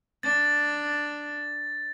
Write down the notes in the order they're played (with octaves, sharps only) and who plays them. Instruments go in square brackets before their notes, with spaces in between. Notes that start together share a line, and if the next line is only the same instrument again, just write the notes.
[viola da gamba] D4 [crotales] A6